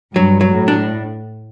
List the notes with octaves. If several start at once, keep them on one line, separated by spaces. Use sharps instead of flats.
G2 F#3
F#3
A2
D4